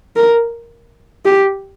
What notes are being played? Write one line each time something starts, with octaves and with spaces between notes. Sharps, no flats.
A#4
G4